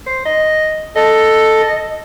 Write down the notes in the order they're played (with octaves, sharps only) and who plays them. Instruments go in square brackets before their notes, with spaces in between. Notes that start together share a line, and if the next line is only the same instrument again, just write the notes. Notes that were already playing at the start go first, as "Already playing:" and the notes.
[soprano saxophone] C5
D#5
[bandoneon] A4 [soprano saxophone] D#5